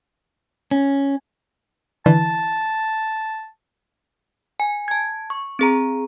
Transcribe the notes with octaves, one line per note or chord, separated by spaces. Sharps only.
C#4
D3 E3 A5
G#5
A5 G#6
C#6
C4 G#4 A#5